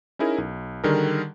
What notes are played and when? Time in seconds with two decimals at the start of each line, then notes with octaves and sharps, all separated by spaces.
0.19 C#4 D#4 E4 G#4 A#4
0.38 B1
0.84 D3 D#3 G3 G#4 A#4